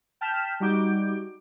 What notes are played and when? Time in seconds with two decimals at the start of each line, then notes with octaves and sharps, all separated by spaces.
0.21 G5 A5 F6 G6 B6 E7
0.60 G3 D#4 F#4 D6 G6 D7